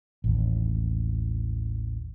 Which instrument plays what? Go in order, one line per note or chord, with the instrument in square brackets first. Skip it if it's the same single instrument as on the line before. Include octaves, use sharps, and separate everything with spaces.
[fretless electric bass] A1 D#2